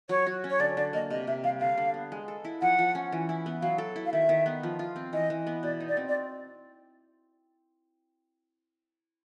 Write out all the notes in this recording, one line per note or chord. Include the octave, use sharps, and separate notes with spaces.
F#3 C#5
F#4
C#4
C#5
D3 D5
D3 D5
A#3 D#5
C3 D#5
C3 E5
G3 F5
D3 F5
D3
B3
G#3
A4
E4
F3 F#5
F3
C#4
E3
E4
B3
F#3 F5
A4
E4
F5
D#3 E5
D#3
B3
F3
F4
C4
E3 D#5
E3
B3
B2 D5
D#4
D5
C4
D5